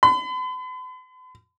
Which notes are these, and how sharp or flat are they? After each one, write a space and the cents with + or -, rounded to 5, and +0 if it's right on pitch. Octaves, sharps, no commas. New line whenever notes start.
B5 +45